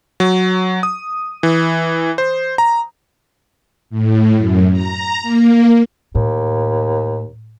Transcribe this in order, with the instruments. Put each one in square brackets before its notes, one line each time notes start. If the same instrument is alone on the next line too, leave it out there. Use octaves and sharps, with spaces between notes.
[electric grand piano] F#3
D#6
E3
C5
A#5
[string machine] A2
F#2
A#5
A#3
[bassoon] D#2 [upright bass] A2